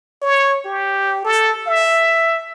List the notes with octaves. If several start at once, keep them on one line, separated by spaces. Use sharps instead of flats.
C#5
G4
A4
E5